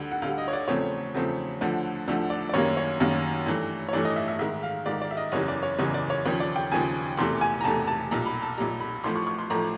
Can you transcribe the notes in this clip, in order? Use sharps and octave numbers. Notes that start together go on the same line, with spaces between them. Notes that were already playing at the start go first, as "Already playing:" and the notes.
Already playing: D2 D3 G3
F#5
D2 D3 G3 F5
D#5
C#5
D5
E2 C#3 F3 A3 C4 C#5
E2 C#3 F3 A3 C4
D2 D3 F3 A3 D4
D2 D3 F3 A3 D4
D5
D5
F#2 D#3 G3 A#3 C#5
C#5
F#2 D#3 G3 A#3
G2 E3 A3
C#5
G2 E3 A3 D5
D#5
E5
E5
G#2 D#3 G#3 E5
F5
G#2 D#3 G#3 D5
D5
E5
D#5
F#1 E2 C#3 E3 G3 C#5
D5
C#5
F#1 E2 C#3 E3 G3 C#5
D5
C#5
D#2 C#3 F3 C#5
D5
G5
D#2 C#3 F3 G#5
E1 E2 C3 E3 A3 C6
G#5
A#5
E1 E2 C3 E3 A3 A5
A5
B1 A#2 G3 A#5
B5
A5
B1 A#2 G3 A#5
B5
A1 A2 F3 A3 C6
C#6
C#6
C6
A1 A2 F3 A3 A#5